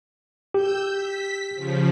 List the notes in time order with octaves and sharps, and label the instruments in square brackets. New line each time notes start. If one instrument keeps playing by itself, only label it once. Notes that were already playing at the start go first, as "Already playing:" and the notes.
[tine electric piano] G4 [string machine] E6 G6
[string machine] B6
C#3 F3